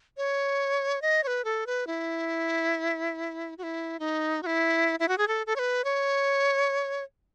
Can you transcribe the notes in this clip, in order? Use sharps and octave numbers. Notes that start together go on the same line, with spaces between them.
C#5
D#5
C#5
B4
A4
B4
E4
F#4
E4
D#4
F#4
E4
E4
F#4
G#4
A4
A4
C#5
B4
C#5